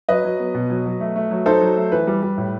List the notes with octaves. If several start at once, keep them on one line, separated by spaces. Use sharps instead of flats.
F#3 B4 D#5
F#3
B3
B2
F#3
F#3
A3
A3
F#3
D#4 A4 C5
F#3
A3
E3 B4
G3
G3
A2